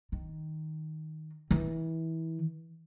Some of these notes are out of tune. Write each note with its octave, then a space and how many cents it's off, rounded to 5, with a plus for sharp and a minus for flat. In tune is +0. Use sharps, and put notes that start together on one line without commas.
D#3 +5
E3 -25